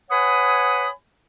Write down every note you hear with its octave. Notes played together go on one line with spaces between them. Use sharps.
B4 C#5 F#5 G#5 B5 D#6